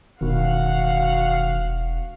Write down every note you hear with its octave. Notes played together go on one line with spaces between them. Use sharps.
E1 B2 D#3 F#4 F5 F#5